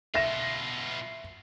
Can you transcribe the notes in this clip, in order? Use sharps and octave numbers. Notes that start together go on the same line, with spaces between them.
B2 F4 E5 A#6 E7